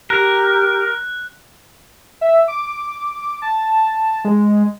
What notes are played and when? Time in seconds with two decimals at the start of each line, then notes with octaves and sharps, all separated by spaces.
0.10 G4 A#4 F#6
2.21 E5
2.48 D6
3.42 A5
4.25 G#3